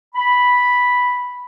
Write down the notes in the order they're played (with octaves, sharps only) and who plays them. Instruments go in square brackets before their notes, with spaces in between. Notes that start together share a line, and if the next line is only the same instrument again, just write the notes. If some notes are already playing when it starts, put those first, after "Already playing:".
[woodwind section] B5